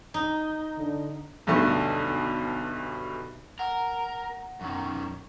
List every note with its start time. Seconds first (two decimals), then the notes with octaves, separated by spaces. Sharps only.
0.14 D#4
0.78 D3
1.47 B1 G2 D3 A3
3.59 A#4 F#5
4.61 F#2 D#3